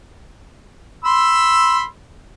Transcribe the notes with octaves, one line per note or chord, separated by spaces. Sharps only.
B5 C6 E6